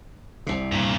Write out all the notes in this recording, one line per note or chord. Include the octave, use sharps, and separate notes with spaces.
C2 C3
G2 A#2